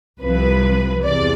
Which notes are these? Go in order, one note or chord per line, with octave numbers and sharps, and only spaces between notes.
C2 C3 F3 B4
E2 C3 D5